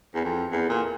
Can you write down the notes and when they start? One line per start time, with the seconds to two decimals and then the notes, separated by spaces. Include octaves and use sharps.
0.15 E2
0.24 F2
0.52 E2
0.70 A#2